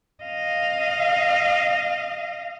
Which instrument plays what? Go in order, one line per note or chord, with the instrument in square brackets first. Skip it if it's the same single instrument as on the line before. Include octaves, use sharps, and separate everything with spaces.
[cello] D#5 F5